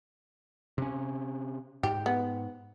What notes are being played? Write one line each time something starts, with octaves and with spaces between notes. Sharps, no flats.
C3 C#4
G#2 G4
B3